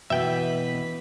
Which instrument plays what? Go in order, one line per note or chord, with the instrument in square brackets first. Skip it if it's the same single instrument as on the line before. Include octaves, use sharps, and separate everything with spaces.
[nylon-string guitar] B2 [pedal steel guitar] E3 [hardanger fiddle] B4 [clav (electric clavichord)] E5 G5